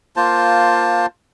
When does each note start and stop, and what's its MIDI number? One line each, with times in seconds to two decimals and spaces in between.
0.16 1.06 58
0.16 1.06 65
0.16 1.06 72
0.16 1.06 81